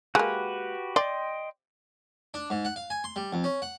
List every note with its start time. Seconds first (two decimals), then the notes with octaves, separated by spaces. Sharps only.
0.15 G#3 A#3 F#4 G4 B4
0.96 D5 D#5 G5 C6
2.34 D4
2.50 G#2
2.65 F#5
2.76 F5
2.90 G#5
3.04 C6
3.16 G3
3.33 F2
3.44 C#4
3.62 F#5